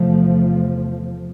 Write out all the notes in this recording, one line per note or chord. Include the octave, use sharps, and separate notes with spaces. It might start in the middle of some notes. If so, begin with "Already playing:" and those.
Already playing: E2 C3 F3 A3